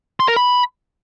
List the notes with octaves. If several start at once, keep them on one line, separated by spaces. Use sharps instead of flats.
C6
A#4
B5